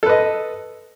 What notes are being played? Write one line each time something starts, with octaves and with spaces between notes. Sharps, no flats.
A4 B4 D#5